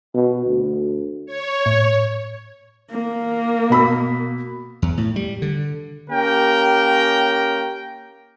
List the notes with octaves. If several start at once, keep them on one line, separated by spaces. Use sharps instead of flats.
B2
D2
C#5
A2
A#3
B2 B5 E6
E2
A2
G3
D3
A#3 C#4 G4 A#4 G5